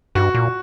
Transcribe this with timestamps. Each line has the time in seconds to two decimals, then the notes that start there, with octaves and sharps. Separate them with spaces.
0.15 G2 F#4
0.35 A#2